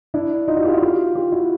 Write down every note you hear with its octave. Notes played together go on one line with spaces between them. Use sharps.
D4 E4
D#4 F4
E4 F#4
F4 G4
E4 F#4
F4 G4
F4 G4
E4 F#4